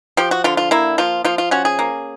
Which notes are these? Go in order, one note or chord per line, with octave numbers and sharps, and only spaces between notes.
F3 G4
F#4
D3 F4
F4
A#3 E4
F3 F4
F3 F4
F4
C#4 F#4
G#4
A#3